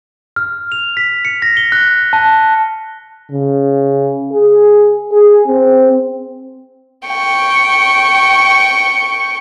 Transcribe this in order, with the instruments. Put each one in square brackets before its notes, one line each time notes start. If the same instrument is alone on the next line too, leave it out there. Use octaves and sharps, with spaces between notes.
[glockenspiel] F6
F7
B6
C#7
A#6
G7
F#6
A5
[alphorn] C#3
G#4
G#4
C4
[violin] G5 C#6